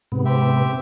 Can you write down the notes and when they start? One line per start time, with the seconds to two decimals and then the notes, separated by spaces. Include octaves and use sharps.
0.12 G#2 C3 B3
0.25 C4 G4 E5